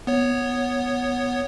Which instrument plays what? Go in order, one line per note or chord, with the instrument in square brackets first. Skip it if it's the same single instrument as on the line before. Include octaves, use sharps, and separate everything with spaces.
[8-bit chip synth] B3 C#5